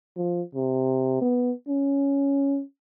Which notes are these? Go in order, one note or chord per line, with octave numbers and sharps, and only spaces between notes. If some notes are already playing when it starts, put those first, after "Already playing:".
F3
C3
B3
C#4